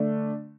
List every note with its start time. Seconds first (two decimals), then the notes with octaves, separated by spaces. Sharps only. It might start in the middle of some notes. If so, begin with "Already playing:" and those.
Already playing: D3 A3 D4